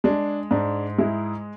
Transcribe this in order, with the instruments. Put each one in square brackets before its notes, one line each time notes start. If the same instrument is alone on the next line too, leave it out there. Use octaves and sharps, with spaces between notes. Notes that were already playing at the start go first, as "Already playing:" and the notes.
[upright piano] G#3 D4
G#2 D4
G#3 E4